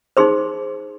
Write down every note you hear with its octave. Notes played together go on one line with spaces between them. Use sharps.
D#4 G#4 C5 C6